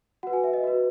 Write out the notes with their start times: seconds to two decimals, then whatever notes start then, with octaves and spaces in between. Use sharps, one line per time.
0.23 F#4 B4 F#5
0.33 G#5
0.44 E5
0.53 D#5
0.64 F#4 B4